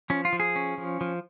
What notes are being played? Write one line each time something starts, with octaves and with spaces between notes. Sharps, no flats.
F3 C#4
F4
F3
G#4
C#4
F3
F3